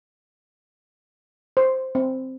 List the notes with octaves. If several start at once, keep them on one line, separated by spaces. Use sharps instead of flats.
C5
C4